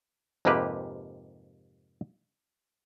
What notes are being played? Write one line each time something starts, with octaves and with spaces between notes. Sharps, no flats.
F2 G#2 C3 A#3 G4 B4